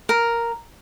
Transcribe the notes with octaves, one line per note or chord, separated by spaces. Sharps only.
A#4